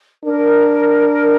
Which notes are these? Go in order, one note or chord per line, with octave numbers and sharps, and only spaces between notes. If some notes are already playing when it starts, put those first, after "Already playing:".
D4 A#4